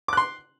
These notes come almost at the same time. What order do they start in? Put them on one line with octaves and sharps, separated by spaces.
D6 F#6 C6